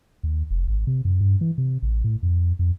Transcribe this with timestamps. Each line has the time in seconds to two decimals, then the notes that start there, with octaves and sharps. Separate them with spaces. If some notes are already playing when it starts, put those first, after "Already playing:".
0.23 D#2
0.51 F1
0.67 G#1
0.87 C3
1.05 F#2
1.21 G2
1.41 E3
1.58 C3
1.82 A1
2.04 A2
2.23 F2
2.59 F2